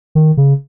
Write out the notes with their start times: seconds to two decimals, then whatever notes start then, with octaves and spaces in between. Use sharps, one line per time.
0.15 D#3
0.37 C#3